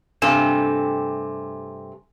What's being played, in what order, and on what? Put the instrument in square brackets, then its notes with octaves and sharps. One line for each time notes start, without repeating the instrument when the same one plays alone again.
[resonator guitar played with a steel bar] G2 C3 A3 [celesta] G#5 E7